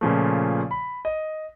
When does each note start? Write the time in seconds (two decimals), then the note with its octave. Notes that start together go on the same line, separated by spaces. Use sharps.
0.01 A#2 C#3 F3 A3
0.71 B5
1.05 D#5